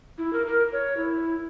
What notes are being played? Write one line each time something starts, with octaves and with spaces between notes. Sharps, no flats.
E4
A#4
A#4
C#5
E4